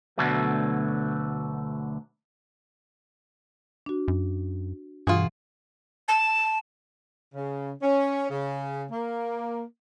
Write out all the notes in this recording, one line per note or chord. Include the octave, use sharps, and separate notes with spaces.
D2 B2 D3 F#3 A3
D4 F#4
F#2
G2 B2 E3 F4 F#4 G#4
A5
C#3
C#4
C#3
A#3